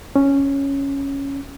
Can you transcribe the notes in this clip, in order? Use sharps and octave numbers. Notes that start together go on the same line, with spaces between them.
C#4